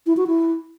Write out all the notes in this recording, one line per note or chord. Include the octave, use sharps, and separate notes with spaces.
E4
F#4
E4